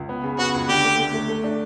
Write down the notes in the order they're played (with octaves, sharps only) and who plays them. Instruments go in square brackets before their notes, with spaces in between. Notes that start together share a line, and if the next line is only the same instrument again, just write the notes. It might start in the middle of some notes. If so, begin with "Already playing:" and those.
Already playing: [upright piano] C#2
B3
C#3
[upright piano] B3 [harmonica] F#4
[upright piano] C#2
[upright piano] D3 [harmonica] G4
[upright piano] A3
A3
A3
A3
D4